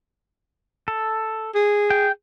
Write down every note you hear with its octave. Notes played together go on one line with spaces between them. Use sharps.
A4
G#4
G5